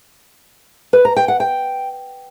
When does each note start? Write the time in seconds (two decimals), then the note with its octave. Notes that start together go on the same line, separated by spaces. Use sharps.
0.93 B4
1.05 A#5
1.16 G5
1.28 F#5
1.40 G5